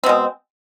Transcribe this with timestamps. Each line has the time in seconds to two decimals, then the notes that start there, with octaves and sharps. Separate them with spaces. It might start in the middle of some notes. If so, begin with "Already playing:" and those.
0.04 C4
0.06 B2
0.09 G#3